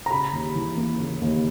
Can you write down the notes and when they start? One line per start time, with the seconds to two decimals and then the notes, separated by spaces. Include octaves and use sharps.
0.06 A#5
0.11 C#3 B5
0.33 D#2
0.55 E3
0.77 A#3
1.00 C#3
1.21 D#2